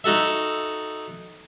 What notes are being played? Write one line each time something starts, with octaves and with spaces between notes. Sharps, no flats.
D#4 F#4 A4 E5